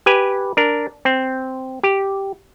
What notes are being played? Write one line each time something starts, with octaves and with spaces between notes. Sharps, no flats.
G4 B4 G#5
D4 A#4
C4
G4